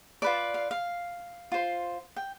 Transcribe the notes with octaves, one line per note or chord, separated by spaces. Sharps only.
F4 B4 D5 A5
F5
F5
F4 C5
G5